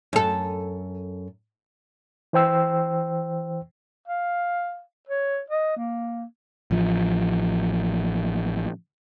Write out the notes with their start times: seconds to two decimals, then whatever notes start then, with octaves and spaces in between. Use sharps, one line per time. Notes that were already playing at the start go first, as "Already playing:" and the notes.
0.13 F#2 A4
2.33 E3 C5 G5 E6
4.08 F5
5.09 C#5
5.50 D#5
5.77 A#3
6.71 A1 F3